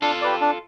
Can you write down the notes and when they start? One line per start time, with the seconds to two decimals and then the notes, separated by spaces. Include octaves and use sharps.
0.02 D4 F4 A4
0.22 G4 B4 D5
0.41 D4